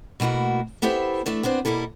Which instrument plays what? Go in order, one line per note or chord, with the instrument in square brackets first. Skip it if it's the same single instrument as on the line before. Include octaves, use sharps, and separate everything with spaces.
[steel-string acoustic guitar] B2 A3 A#3 E4 F#4
B3 E4 G4 A4 C5 E5
E3 A3 D4 E5
B3 C4 D4 C5
B2 G3 A#3 E4 A4